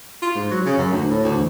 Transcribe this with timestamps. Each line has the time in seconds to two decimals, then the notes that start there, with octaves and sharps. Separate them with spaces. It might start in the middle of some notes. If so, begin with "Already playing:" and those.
0.22 F4
0.35 G#2
0.50 F#3
0.65 C#3
0.77 F#2
0.92 D2
1.09 A2
1.24 D2
1.36 E2